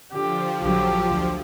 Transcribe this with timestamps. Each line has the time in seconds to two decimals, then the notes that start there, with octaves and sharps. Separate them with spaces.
0.12 D3 F3 G4
0.64 A#1 D3 F#3 G4
1.09 D2